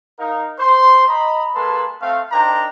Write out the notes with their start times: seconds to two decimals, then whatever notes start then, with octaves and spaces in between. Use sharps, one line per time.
0.19 D#4 A#4 F5
0.59 C5 C6
1.08 D#5 A#5 B5
1.55 G#3 A#3 A4 B4 A5 C6
2.02 A3 C4 F5
2.32 D4 D#4 A#4 C5 G5 A#5